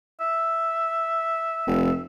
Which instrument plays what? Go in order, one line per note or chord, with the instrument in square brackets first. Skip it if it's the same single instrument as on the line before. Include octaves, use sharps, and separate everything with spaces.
[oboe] E5
[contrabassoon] F1